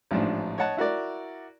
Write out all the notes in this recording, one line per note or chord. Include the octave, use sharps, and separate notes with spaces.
A1 G#2 F3 D4
C#5 D#5 F#5 A5
E4 F#4 A#4 D5